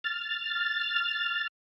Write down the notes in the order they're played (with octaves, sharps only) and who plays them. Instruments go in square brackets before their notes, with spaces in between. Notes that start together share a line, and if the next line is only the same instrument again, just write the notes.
[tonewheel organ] F6 A6